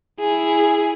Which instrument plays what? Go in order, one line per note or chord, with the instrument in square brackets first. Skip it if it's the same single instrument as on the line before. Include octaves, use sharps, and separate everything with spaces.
[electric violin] E4 G#4